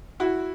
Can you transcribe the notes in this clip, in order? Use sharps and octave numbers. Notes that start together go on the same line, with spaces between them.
E4 F#4